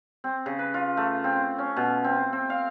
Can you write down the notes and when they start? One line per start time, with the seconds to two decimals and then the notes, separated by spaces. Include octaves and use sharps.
0.24 C4
0.46 C#3
0.59 B4
0.74 F4
0.97 A3
1.24 C4
1.58 C#4
1.76 B2
2.04 C4
2.33 C4
2.50 F5